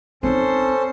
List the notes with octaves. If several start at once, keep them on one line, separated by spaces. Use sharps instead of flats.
C4 C#4 D#4 A4 C5